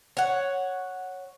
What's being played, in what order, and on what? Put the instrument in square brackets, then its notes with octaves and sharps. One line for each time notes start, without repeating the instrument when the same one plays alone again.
[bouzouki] C#5 F#5